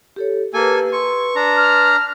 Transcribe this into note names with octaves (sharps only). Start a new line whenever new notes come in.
G4 A4 C#5
A#3 G4 A4 B4 G#5
B4 C6 C#6 E6
D4 A#5
F6